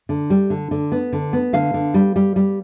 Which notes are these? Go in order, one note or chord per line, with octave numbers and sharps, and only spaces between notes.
D3
G3
D3
D3
B3
D3
B3
D3 F5
D3
G3
G3
G3